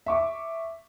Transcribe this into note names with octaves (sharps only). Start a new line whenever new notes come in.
E5 C#6 D6